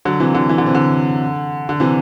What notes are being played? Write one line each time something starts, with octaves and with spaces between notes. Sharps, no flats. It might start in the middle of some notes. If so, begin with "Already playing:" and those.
D3 F#3
C3 E3
D3
E3
D3
C3
D3
D3
C3 E3